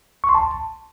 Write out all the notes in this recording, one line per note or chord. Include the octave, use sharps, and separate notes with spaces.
C#6
C6
A5